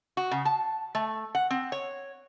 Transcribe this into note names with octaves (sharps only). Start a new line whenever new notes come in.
F#4
C#3
A5
A3
F#5
C4
C#5